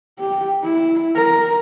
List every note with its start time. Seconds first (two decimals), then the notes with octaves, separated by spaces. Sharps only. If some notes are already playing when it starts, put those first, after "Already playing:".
0.19 G4
0.63 E4
1.16 A#4